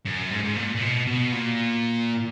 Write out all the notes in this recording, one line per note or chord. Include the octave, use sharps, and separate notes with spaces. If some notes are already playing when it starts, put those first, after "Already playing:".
F#2
G#2
G#2
A#2
A#2
B2
B2
A#2